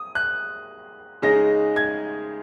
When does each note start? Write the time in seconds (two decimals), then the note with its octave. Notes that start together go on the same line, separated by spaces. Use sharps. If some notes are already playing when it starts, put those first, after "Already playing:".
Already playing: D#6
0.15 F#6
1.22 C#3 G#3 D#4 A#6
1.76 G#6